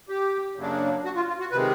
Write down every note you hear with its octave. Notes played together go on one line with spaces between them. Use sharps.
G4
F#2 C#3 F#3 A#3 D4
F#4
F4
F4
F#4
C3 D#3 G#3 B4